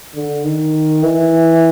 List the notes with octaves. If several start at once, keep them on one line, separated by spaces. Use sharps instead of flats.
D3
D#3
E3